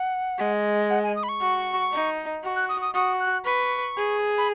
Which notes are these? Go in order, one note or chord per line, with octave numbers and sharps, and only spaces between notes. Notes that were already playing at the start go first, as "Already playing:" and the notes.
Already playing: F#5
G#3
F#5
G#5
D#6
B5
C#6
F#4
D#4
F#4
F#6
D#6
D#6
F#4 D#6
F#6
B4 C#6
G#4
B5